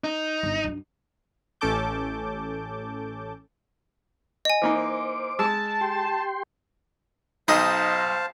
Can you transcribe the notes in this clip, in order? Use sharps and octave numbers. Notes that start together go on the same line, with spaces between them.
D#4
G1
F#2 D4
A1 C#4 A4 A5 D6 G6
D#5 G#5
E3 A#3 D#4 C5 D6
G#3 A5 E6
G4 G5 C6
B1 D#4 C5 F5 A5